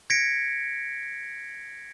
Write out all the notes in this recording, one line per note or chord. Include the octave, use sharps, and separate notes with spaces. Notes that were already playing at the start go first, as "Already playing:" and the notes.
G#6 A#6 B6 C#7 D7